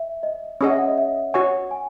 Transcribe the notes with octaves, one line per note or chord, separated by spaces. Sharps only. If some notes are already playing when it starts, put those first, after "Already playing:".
Already playing: E5
D#5
C#4 G#4 C#5 D#5 F#5
E5
F#5
D#5
E5
F#4 C#5 F#5 G#5 C#6
G#5